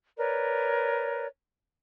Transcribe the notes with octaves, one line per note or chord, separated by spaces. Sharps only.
A#4 B4 C#5 D5